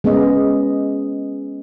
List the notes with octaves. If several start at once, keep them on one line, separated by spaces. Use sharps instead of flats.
G#3 B3 C#4 G#4 D#5